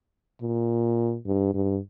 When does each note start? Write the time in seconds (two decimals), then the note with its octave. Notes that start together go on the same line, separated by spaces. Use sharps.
0.41 A#2
1.26 G2
1.54 G2